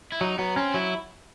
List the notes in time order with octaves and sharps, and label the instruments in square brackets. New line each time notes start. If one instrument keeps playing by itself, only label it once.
[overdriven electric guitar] E4
[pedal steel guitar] F#3 [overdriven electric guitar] D#4
[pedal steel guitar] F#3 [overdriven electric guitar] B3
[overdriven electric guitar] C4 [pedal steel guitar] C#4
[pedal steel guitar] F#3 [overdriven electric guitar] E4